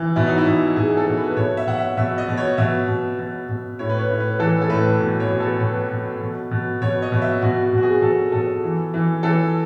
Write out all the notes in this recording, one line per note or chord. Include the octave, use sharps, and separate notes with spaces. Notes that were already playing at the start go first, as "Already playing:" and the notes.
Already playing: E3
B2 E4
D#4
E4
B2
B2 G#4
A4
B2
B4
B2 C#5
E5
B2 F#5
E5
B2 E5
D#5
B2
C#5
B2 E5
B2
B2
B2
A2 C#5
B4
C#5
A2
B4
E3 A4
A4
A2 B4
B2
C#5
B2
A4
B2 B4
B2
B2
B2
B2 C#5
D#5
B2
E5
B2 F#4
F#4
B2
F#4
G#4
B2 A4
B2 A4
E3
E3
E3 A4